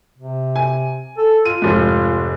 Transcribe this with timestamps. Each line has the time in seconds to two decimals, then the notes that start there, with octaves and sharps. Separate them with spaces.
0.18 C3
0.56 G#5
1.17 A4
1.45 F4 D#7
1.62 F1 G#2 F4